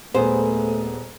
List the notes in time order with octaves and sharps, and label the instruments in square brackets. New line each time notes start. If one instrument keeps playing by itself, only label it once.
[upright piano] D#1 B3 G#4 [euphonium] A3 [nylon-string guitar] C5